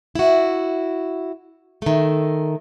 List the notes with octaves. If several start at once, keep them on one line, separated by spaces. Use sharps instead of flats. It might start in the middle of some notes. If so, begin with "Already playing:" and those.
E4 F#4
D#3 A3